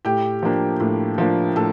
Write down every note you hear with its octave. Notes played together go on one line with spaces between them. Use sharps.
A2 G4 G5
F3 A#3 D4
A2
F3 A#3 D4
A2 A4 A5